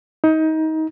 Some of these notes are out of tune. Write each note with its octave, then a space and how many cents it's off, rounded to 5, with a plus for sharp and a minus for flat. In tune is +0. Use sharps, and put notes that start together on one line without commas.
D#4 +25